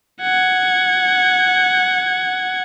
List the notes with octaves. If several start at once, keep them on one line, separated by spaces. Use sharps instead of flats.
F#5 G#6